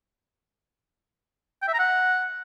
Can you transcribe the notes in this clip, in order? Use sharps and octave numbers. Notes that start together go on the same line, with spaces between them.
G5
E5
A#5
F#5